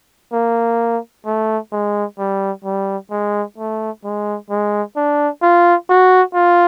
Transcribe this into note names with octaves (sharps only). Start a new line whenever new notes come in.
A#3
A3
G#3
G3
G3
G#3
A3
G#3
G#3
D4
F4
F#4
F4